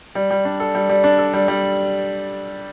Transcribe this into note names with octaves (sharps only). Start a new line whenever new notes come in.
G3
G3
D4
A4
G3
G3
D4
A4
G3
G3